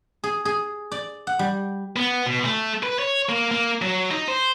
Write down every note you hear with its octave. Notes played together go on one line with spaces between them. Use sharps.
G#4
G#4
D5
F#5
G3
B3
B2
A3
B4
C#5
A#3
A#3
F#3
D#4
C5